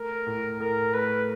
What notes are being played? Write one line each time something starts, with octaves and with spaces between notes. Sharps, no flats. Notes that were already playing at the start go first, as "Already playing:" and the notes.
Already playing: A3 A#4
A2
A2 A#4
A3 B4